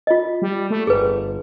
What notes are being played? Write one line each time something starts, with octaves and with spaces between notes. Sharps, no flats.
F4 D#5
G3
A3
G1 G#4 B4